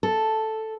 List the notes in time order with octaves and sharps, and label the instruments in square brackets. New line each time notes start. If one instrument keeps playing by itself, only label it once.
[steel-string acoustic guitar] A4